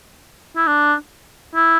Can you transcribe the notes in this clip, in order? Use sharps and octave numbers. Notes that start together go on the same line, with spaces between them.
E4
D4
E4